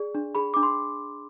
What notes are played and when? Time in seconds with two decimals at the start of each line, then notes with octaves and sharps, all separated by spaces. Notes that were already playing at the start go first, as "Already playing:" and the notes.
Already playing: G#4 D5
0.15 D4
0.35 G#4 B5
0.54 D4 D6
0.63 C6